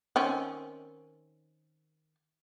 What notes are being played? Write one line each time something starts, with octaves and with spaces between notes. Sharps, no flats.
D#3 C4 C#4